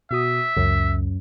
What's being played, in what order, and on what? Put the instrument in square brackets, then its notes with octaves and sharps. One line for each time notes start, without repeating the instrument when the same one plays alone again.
[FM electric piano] B2 F#4 D#6 [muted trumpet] E5
[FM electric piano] C#2 [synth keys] F#2